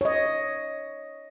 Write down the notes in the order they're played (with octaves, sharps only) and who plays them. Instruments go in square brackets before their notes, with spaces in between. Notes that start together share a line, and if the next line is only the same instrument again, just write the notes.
[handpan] C#5 D#5